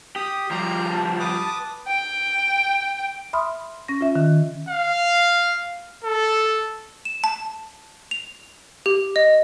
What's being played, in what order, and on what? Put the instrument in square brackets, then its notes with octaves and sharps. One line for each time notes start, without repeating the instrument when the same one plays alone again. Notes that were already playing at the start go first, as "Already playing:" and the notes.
[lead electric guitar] G4 [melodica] D#6
[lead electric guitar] F3 G3 [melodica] G4 A#5 C6
[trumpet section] A5
[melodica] B4 D6 D#6
[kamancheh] G5
[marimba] E5 B5 C6 D#6 F6
C#4 A#6
F4 E5
D#3
[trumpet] F5
A4
[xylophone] E7
A5
F7
G4
D#5